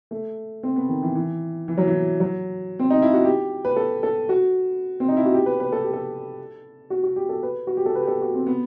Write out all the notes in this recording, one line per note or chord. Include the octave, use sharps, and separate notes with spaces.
A3
C4
B3
D#3
E3
E3
E3
F#3
E3
F#3
C4
D#4
E4
F#4
G4
B4
A4
A4
F#4
C4
D#4
E4
F#4
G4
B4
B4
A4
G4
A4
F#4
F#4
G4
A4
B4
F#4
G4
A4
B4
G4
A4
F#4
C4
B3